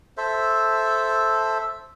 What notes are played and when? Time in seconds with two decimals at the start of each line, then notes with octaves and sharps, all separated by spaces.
0.17 A4 C5 E5